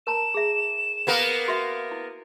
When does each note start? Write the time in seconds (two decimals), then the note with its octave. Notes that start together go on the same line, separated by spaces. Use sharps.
0.07 A#4 A5 A#5 E7
0.34 G#4 E5
1.07 A#3 B3 A#4
1.48 F#4 E5
1.91 E4